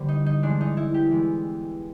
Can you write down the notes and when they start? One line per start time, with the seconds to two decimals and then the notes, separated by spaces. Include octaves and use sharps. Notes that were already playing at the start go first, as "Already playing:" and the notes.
Already playing: D3 G3 A#3 C5
0.08 D#4
0.26 D#4
0.42 E3 G#3 B3 D4
0.61 D#4
0.77 E4
0.94 G4
1.11 E3 G#3 B3